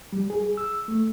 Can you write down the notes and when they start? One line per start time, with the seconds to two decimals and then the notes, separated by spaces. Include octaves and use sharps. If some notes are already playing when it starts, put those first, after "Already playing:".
0.13 G3
0.30 G#4
0.57 E6
0.88 A3